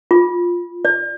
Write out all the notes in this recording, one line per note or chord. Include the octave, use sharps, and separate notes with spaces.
F4
D5